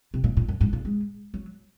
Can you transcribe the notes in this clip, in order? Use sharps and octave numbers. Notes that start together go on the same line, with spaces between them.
C3
A#2
A#2
F#2
G#2
A#2
G#3
F#3